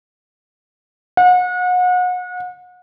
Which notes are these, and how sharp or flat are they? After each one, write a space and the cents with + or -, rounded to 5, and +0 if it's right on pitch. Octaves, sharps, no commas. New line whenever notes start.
F#5 -35